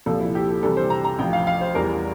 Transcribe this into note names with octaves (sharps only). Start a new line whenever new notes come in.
C2 A#2 F3 A4
E4
G4
A4
C2 C3 E3 G3 A4
C5
A#5
A#5
A1 A2 F3 G5
F5
F5
C5
E2 E3 G3 A#4